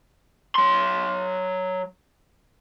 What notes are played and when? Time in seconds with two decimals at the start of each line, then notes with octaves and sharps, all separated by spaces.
0.55 F#3 C6